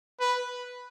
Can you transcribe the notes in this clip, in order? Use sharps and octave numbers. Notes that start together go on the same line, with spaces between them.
B4